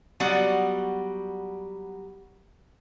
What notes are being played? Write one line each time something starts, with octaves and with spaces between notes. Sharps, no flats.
F#3 G3 B3 D5 F#5